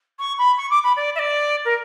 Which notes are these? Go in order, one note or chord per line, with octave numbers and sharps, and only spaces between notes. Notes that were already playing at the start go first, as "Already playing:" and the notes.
C#6
B5
C#6
D6
B5
D5
E5
D5
A#4